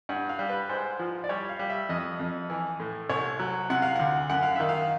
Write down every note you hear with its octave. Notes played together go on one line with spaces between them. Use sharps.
G2 F#5
F5
G3
B4
G#2 C5
F3
D5
G3 C#5
F5
G3
E5
F2 D#5
F2
E3
A2
C2 C#5
F#3
C3 F#5
F5
D2 F#5
F#2 F#5
F5
D#3 E5
F5